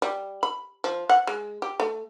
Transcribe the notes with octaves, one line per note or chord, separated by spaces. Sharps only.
G3
B5
F3
F#5
G#3
G4
A3